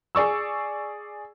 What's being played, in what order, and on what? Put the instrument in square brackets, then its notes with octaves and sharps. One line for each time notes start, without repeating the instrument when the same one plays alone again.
[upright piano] G#4 D5 C#6 E6